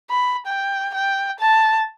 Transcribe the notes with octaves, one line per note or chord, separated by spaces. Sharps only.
B5
G5
G5
A5